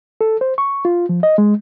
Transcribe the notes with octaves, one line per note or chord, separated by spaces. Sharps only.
A4
C5
C#6
F4
F3
D#5
G#3